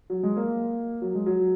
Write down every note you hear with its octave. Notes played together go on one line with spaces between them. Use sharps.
F#3
G#3
A#3
F#3
G#3
F#3